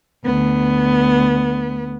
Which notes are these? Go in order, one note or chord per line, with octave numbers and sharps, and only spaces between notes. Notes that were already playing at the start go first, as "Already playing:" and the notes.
D2 B3